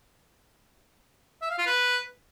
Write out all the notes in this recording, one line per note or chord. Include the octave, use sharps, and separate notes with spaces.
E5
F5
F4
B4